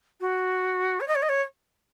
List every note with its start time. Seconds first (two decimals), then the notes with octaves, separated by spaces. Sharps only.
0.20 F#4
1.00 C#5
1.08 D#5
1.15 C#5
1.22 D#5
1.29 C#5